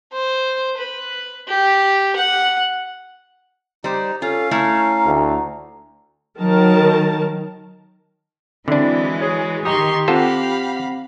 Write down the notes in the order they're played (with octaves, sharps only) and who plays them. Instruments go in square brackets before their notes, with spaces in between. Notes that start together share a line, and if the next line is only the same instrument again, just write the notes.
[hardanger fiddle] C5
B4
G4
F#5
[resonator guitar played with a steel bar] G3 C5 [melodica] D#4
[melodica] C#4 F5 [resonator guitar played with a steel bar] F4 [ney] A4
[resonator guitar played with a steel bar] A3 E4 C#5 [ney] A#5
[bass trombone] D2
[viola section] D#3 A#4 A5 [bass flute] F#3
[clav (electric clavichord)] D3 D4 [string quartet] E3 F#3 G#3 [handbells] C4 D5 [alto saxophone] E4
[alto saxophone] G#4 [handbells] C#5
[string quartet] D#3 C6 C#6 [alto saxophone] G4 [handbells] D#5 A#5 D#6
[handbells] C4 F#5 A#6 [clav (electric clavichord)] F4 A4 C5 [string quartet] F5 B5